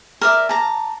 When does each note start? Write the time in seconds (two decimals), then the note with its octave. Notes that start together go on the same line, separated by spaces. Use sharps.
0.21 A#4 D5 E5
0.49 A5 A#5